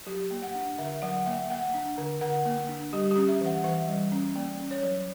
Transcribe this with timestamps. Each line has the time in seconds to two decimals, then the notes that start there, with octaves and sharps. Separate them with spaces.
0.06 F#3 G4
0.31 A#3
0.42 F#5
0.55 D4
0.78 D3 E5
1.02 F#3 F#5
1.26 A#3 E5
1.50 A#3 F#5
1.74 D4
1.98 D3
2.21 D3 F#5
2.46 A#3
2.68 D4
2.93 G3 G4
3.11 G4
3.16 C#4
3.28 E5
3.41 E3 F#5
3.64 E3 E5
3.88 G3
4.12 C#4
4.36 A#3 D5
4.60 C#4
4.71 C#5
4.83 F#3